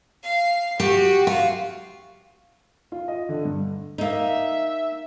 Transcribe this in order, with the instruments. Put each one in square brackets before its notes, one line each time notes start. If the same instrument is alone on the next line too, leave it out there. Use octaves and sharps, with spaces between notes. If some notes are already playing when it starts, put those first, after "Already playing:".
[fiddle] F5
[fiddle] F#4 [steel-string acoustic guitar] G4
[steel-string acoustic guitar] F4
[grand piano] F4
D#5
D3
G2
[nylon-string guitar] A#3 D#4 [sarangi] E5